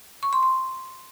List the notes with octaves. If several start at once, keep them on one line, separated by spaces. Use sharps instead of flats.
C#6
C6
C6